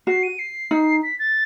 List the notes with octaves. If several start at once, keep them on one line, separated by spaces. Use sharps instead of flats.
F#4 C7
D#7
C7
D#4
B6
A6